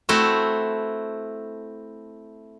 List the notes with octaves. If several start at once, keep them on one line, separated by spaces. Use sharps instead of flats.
A3 C4 E4 F#4